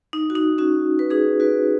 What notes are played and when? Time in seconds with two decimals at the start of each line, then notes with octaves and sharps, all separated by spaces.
0.13 D#4
0.30 F#4
0.35 D#4
0.58 C#4 F#4
0.99 B4
1.10 D#4 G#4
1.40 F#4 B4